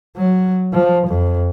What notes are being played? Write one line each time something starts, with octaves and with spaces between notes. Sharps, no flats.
F#3
F3
F2